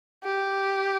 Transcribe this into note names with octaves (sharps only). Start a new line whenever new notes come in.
G4